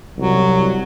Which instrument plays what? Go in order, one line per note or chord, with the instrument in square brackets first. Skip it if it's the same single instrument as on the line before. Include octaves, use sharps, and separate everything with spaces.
[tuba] C2 [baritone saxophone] F#3